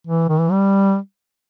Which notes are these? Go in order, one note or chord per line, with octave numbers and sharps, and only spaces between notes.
E3
D#3
E3
G3